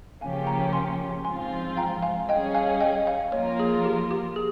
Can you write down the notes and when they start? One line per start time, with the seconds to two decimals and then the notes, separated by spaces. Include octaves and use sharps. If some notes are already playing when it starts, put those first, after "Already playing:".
0.21 C#3 F3 A#3 C#4 G4 F5 G#5
0.47 G5 A#5
0.73 G#5 C6
1.25 G#2 F3 C4 F4 G#5 C6
1.77 G5 A#5
2.03 F5 G#5
2.29 G3 C#4 G#4 D#5 G5
2.54 F5 G#5
2.80 D#5 G5
2.96 D#5
3.07 F5
3.32 F3 A#3 F4 A#4 C#5
3.59 G#4
3.85 G4
4.11 G4
4.36 G#4